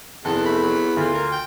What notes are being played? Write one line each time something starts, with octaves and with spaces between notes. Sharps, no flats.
F1 E2 B3 A4
A3 B5
F#3
D2 F4
A#4
G5